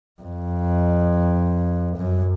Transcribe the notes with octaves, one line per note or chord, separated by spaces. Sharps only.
F2
F#2